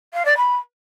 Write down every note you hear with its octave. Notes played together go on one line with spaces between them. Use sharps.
F5
D5
B5